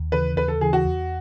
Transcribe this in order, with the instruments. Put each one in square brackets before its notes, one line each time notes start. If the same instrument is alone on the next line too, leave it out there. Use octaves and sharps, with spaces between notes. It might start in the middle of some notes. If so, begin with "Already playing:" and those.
Already playing: [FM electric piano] D#2
[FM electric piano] C#3 E3 [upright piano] B4
[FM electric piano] D#2 [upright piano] B4
[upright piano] A4
[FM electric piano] C#3 E3 [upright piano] G#4
[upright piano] F#4
[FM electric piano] E2